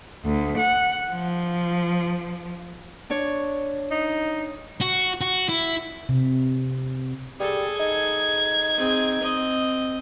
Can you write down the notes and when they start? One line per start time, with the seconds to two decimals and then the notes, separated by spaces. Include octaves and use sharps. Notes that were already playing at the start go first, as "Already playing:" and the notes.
0.25 D2
0.58 F#5
1.11 F3
3.10 D4 C#5
3.91 D#4
4.81 F#4
5.21 F#4
5.49 E4
6.09 C3
7.40 G3 G#4 A4
7.80 D#4 G#6
8.77 C4 G#4
9.21 C4 D#5